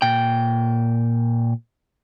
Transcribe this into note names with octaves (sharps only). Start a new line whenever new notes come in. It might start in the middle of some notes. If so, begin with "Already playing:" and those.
A#2 G5